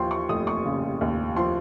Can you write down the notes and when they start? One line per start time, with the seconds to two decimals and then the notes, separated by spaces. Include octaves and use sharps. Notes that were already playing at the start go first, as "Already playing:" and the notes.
Already playing: D#2 F3 G5 C6
0.11 C#6
0.29 F1 D#6
0.47 C#6
0.65 C#3
1.01 D#2
1.36 F3 C6